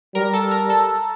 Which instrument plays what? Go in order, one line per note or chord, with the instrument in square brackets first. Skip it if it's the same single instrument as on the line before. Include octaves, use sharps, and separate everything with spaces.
[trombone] G3 [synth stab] A#4 A#5
[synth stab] A4 A5
A#4 A#5
A4 A5